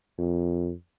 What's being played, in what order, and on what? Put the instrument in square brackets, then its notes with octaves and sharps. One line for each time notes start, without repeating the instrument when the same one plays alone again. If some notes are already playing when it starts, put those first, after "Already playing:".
[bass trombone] F2